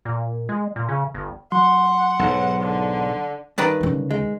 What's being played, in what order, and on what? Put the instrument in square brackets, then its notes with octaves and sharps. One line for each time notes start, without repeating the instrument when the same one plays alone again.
[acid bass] A#2
G#3
A#2
C#3
G1
[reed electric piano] F#3 [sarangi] F#5 [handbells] C6
[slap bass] B1 G#2
[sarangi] D3
[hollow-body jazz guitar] G2 [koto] D#3 B4 D5
[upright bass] D2 C#3
[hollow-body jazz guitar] G#3